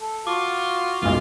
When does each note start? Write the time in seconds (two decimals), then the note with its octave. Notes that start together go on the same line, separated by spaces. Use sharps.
0.01 A4
0.27 F4 F#4 D6
1.02 F#1 B1 F4